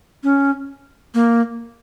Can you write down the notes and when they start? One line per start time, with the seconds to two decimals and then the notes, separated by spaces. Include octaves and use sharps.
0.24 C#4
1.14 A#3